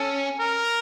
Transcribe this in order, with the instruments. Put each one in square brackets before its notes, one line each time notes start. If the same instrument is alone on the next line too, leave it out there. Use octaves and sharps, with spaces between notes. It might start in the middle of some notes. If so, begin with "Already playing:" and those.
Already playing: [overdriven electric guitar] C#4 [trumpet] A4
[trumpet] A#4